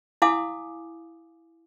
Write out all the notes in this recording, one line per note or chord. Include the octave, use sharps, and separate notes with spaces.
E4 F5 G#5 D6 D#6